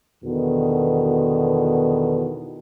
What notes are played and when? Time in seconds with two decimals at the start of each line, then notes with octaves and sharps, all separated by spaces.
0.23 E2 B2 D3 D#3